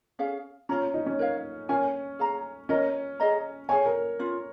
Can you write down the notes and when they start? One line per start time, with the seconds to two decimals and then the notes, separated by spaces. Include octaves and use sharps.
0.19 C#4 G#4 F5
0.69 C#4 F4 C#5 A#5
0.94 D#4
1.06 C#4
1.19 A#4 C#5 F5
1.69 C#4 A#4 F5 G#5
2.19 G#4 F5 A#5
2.69 C#4 A#4 D#5 A#5
3.20 G#4 D#5 A#5
3.69 G#4 C#5 F5 G#5
3.86 A#4
4.19 C#4 F4